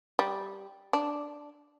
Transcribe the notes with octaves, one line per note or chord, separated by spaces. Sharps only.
G3
D4